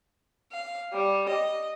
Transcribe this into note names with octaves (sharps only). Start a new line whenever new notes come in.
F5
G3
D#5